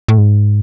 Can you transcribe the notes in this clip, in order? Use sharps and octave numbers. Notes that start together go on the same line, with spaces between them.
A2
G#2